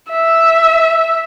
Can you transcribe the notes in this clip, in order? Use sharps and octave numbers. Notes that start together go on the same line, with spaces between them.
E5